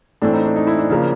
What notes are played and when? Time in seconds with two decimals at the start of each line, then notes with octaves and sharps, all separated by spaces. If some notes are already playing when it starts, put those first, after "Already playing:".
0.22 A2 E3 A3 C4 D4
0.34 D#4
0.45 D4
0.56 D#4
0.67 E4
0.79 D4
0.90 C#3 F3 A#3